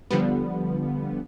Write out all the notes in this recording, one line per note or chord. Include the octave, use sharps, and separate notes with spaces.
D3 F3 G3 B3